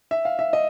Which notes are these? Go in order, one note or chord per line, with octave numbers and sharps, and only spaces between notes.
E5
F5
E5
D#5